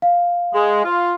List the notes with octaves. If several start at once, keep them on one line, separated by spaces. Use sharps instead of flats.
F5
G#3
F4